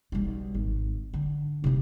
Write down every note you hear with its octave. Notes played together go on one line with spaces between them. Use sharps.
B1 G3
G#1
D3
C3 E4